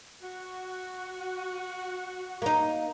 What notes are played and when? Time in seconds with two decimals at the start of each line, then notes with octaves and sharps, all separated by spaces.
0.22 F#4
2.42 A#3 D#4